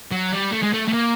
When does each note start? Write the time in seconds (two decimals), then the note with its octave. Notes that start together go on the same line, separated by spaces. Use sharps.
0.12 F#3
0.33 G3
0.52 A3
0.62 G#3
0.73 A3
0.88 A3
0.93 A#3